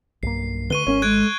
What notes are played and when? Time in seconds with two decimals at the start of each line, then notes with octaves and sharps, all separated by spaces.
0.23 B1 G2 A#3 C7
0.70 D2 B4 C#6 D#7 G7
0.87 G#1 C#4 A#4 C#5 C#6
1.02 G#3 A4 F#6 G#6 D7